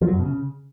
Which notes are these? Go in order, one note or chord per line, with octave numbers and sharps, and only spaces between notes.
F3
F#3
F#2
B2
C#3